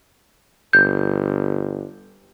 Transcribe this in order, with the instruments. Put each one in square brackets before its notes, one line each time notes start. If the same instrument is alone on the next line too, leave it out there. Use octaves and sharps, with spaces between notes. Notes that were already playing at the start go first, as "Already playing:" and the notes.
[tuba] G1 [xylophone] G6